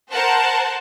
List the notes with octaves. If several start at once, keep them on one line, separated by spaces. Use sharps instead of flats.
A#4 C5 F#5 A5